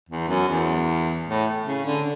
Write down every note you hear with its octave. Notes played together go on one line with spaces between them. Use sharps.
E2
F#2
E2
A2
C#3
D3